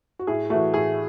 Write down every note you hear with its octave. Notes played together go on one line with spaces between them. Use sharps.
F#4
A2 G#4
E3 A3 F#4
A2 G#4